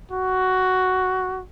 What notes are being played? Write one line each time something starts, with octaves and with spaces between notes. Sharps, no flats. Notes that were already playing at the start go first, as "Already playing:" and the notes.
F#4